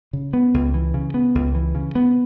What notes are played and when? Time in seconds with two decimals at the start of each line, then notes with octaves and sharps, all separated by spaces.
0.13 C#3
0.33 B3
0.54 C#2
0.74 E3
0.94 C#3
1.14 B3
1.35 C#2
1.55 E3
1.75 C#3
1.95 B3